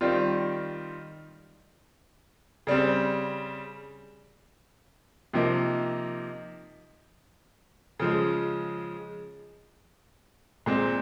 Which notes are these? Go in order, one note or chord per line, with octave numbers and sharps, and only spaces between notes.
D#3 G3 C4 F4
C#3 G3 C4
C3 F3 A#3 D#4
C#3 F3 G#3
A#2 G#3 C4